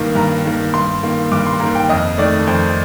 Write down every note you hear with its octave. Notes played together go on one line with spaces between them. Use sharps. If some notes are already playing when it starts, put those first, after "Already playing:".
Already playing: G2 D#3 A#3
G2 A#5
D#3 A#3
G2 C6
D#3 A#3
G2 D6
C6
D#3 A#3 A#5
G5
F2 D#5
D#3 A3 D5
F2 C5